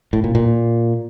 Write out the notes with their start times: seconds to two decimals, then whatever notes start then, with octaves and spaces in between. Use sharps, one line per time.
0.13 A2
0.24 A#2
0.35 A#2